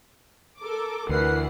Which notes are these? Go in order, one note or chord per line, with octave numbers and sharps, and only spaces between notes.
A4 A#4 D6
D2 E3 A#4 B4 F#5 C7